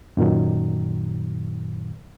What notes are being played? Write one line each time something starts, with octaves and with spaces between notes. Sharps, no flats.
F#2 A#2 D#3 F#3